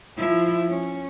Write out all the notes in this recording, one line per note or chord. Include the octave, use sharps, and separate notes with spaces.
F3 E4
C#4